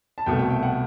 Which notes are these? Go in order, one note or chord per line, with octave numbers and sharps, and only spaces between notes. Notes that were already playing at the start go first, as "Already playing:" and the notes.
A5
C2 B2 A3 G5
G5
G5
F#5